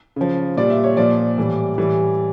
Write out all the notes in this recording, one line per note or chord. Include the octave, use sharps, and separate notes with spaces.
C#3 F3
A#2 G3 D5
E5
C#5
A#2 F3 D5
A2 E3 G3
A2 E3 G3